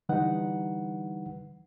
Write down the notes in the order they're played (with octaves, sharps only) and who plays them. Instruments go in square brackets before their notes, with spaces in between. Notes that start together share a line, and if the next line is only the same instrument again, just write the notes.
[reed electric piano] D3 E3 G3 D#4 B4 F#5